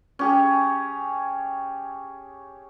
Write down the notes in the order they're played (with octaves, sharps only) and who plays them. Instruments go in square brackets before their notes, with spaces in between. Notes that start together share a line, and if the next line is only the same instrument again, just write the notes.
[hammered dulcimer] C#4 G4 G#4